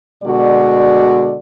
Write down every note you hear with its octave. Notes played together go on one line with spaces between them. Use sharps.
B2 D3 G#3 F#4 D5